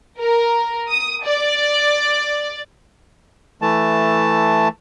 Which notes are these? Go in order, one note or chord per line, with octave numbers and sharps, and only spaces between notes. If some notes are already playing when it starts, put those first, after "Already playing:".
A#4
D#6
D5
E3 A3 A5